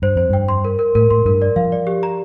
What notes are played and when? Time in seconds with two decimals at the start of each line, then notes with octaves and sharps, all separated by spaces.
0.02 G2 C5
0.15 F2 C5
0.30 G2 G5
0.48 C6
0.65 A#4
0.79 A#4
0.95 A2 A#4
1.10 A2 C6
1.25 G2 A#4
1.42 D5
1.56 F3 F5
1.72 D5
1.87 G4
2.03 A#5